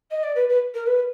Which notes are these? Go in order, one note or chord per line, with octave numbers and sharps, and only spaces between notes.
D#5
D5
B4
B4
A#4
B4